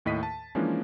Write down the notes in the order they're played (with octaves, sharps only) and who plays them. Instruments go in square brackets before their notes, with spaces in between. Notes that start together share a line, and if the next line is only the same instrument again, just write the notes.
[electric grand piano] D#2 A2 D#5 B6 D#7
A5
E3 F3 G#3 A#3 C#4 D4